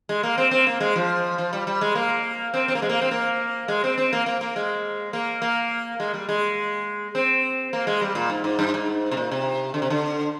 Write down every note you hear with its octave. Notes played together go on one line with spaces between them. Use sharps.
G#3
A#3
C4
C4
A#3
G#3
F3
F3
G3
G3
G#3
A#3
C4
C4
A#3
G#3
A#3
C4
A#3
G#3
C4
C4
A#3
A#3
A#3
G#3
A#3
A#3
G#3
G3
G#3
C4
A#3
G#3
G3
A#2
G#2
G#2
G2
G#2
C3
A#2
C3
D3
C3
D3